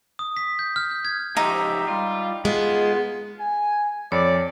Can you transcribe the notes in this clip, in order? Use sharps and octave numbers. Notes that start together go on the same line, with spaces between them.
D#6
B6
G6
F6
G6
G#6
G#2 F3 D#4 G4 E5
G3 F4
G#3 B3 F4
G#5
F2 C#5 D5